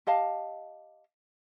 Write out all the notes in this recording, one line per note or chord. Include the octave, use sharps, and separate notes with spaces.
G4 D#5 F5 A5